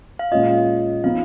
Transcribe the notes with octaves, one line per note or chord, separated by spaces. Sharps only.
F5
A#2 G#3 C#4 F4 D#5
F3 B3 D#4 F5